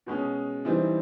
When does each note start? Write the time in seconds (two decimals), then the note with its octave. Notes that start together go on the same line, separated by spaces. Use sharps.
0.06 B2 G#3 C#4
0.65 E3 G3 C4 D#4